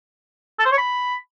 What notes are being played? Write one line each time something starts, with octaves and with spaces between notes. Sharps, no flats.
A4
C5
C#5
B5